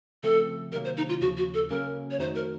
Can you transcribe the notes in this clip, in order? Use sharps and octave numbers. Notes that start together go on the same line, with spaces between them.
C#3 F3 A3 C4 A4
C3 D#3 F#3 A#3 A#4
C5
D#4
F4
D#2 C#3 F3 F#4
F#4
A4
C#3 F#3 A#3 C#4 A#4
C#5
F2 D#3 A3 D#4 F#4 C5
A#4